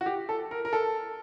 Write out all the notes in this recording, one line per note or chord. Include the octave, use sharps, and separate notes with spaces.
F#4
G4
A4
A#4
A#4
A4